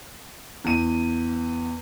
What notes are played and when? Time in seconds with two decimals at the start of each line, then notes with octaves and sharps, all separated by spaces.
0.64 E2 D#7